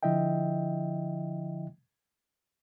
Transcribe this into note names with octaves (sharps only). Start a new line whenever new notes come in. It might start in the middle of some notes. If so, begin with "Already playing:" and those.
D3 F3 E4 D#5 E5 G5